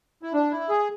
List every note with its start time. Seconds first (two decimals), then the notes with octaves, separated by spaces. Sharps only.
0.23 E4
0.33 D4
0.51 E4
0.69 G#4